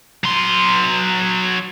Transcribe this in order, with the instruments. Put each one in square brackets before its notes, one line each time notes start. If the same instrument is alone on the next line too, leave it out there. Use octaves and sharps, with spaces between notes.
[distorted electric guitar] F#3 C6